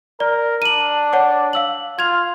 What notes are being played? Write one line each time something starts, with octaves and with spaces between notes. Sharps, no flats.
A#4 D5
D4 D#7 F#7
C#5 F#5 D6
F5 E6 F#7
F4 G#6 F7